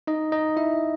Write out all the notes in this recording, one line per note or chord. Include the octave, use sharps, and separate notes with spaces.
D#4 D#5
D#4 D#5
E4 E5